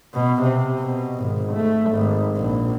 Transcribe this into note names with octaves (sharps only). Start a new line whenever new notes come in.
B2
C3
B2
G#1
A3
G#1
A#1